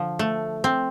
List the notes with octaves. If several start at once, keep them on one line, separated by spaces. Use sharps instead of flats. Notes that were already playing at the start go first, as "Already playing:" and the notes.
Already playing: D3 F3
A3
C4